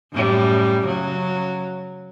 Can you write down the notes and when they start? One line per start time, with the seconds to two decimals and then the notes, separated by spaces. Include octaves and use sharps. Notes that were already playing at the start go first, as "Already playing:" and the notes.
0.12 F#2 A2 G3
0.83 C#3 F#3